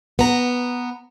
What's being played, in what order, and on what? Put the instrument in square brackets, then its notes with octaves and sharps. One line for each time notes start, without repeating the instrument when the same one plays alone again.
[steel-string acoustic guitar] B3 A#5